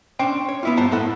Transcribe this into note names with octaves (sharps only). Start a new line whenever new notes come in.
C#4 D4 C5 G5
C#5
B3 E4 F4
G2 C5 F#5 A5 A#5
A2 E4 A4 F#5